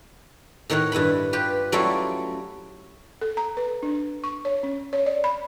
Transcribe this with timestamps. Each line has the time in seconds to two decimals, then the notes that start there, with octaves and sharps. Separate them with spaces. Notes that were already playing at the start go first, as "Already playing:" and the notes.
0.70 A2 D#3 A#4 C#5 F#5
0.92 G2 E4 B4 B5
1.33 F4 G4 B4
1.72 F#3 G3 A3 C#4 E4 F4
3.22 A4
3.37 A#5
3.57 B4
3.83 D4
4.24 C#6
4.45 C#5
4.63 C#4
4.93 C#5
5.06 D5
5.24 B5